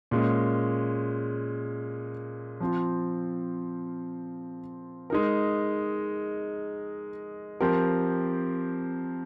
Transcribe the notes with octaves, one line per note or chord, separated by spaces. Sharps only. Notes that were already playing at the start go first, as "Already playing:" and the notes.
A#2 G#3 C#4
F3 C4 F4
G#3 D#4 A#4
F3 C4 G4 A#4